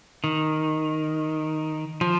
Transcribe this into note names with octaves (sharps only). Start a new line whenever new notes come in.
D#3
F3